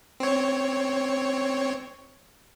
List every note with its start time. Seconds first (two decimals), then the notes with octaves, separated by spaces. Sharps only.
0.20 C4 C#5